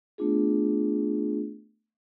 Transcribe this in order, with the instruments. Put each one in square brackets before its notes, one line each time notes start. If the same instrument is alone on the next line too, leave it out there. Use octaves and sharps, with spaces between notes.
[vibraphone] A3 B3 D4 F4 G#4